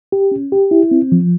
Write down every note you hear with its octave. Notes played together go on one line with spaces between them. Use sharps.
G4
C#4
G4
E4
C4
F3